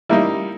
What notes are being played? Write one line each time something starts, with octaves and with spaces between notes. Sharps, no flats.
G3 A#3 D#4 E4